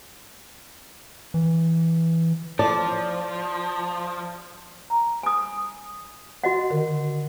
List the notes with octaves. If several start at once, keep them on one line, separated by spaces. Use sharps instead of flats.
E3
F3 D5 A5
A#5
G#5 D#6
F#4 D#5 F#5
D3 D#3 A#4